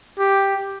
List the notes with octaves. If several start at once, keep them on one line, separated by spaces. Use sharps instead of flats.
G4